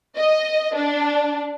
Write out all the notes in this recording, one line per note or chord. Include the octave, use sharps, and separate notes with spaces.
D#5
D4